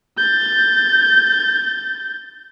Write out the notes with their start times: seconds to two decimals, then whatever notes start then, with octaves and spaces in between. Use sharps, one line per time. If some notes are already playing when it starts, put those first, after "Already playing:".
0.17 G6 A6